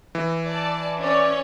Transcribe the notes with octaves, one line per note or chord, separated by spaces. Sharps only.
E3
D5 A5
C#4 C#5 D5